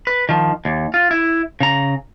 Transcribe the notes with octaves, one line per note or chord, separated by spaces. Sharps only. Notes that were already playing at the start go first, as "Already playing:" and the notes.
B4
D#3 F3
D#2
F4
E4
C#3 A#5